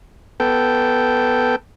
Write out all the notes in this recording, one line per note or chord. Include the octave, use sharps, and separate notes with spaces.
B3 A4 G5